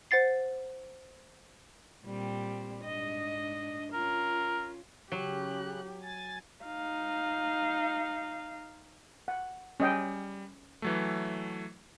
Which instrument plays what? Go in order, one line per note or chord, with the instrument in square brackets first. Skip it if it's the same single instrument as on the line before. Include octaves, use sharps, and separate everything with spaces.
[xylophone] C5 F#5 A6 C7
[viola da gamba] A#2 G3 C4
G#2 D4 D#5
[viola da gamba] C#4 F4 [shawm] A#4
[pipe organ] C#3 F#6 [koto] F#3 [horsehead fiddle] G4
[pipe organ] G#5 A6
[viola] D#4 F5
[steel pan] F#5
[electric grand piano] G3 [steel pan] C#4 D#5 G5
[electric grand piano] E3 F#3 A3